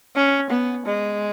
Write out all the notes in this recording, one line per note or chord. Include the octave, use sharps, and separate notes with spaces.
C#4
B3
G#3